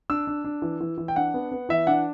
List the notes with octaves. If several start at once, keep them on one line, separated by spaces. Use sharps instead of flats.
D4 E6
D4
D4
E3
E3
E3
G5
D4 F#5
B3
B3
E3 E5
D4 F#5